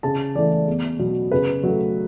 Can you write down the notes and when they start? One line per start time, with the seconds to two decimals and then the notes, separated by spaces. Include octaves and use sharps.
0.03 C#3 A5
0.35 E3 A3 D5
0.67 E2
0.99 B2 F#3 B3
1.32 C#3 B4
1.63 F#3 A3